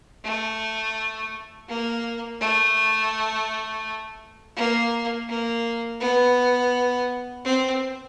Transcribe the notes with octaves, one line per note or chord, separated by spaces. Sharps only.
A3
A#3
A3
A#3
A#3
B3
C4